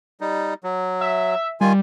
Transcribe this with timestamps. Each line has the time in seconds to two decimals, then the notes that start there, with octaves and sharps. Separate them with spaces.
0.21 G3 D#4
0.64 F#3
1.01 E5
1.61 D#3 G3 F4 G#5